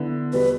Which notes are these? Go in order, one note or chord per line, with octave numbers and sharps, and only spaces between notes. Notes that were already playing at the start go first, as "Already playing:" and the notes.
Already playing: D3 B3 E4
E2 B2 G3 B4